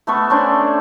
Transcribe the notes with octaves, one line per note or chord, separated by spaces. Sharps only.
A3 B3 A4 C#6
C#4 D4 C5 D5